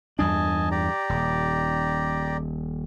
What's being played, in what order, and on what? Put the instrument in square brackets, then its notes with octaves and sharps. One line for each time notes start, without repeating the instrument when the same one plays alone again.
[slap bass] E2 G2 D4 [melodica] D#5 G#5 A5
[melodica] G4 D5 A#5
[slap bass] D#1